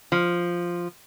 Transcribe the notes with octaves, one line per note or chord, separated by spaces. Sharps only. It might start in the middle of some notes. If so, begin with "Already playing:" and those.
F3